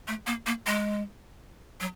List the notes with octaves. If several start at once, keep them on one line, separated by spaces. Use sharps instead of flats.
A3
A#3
A#3
G#3
F#3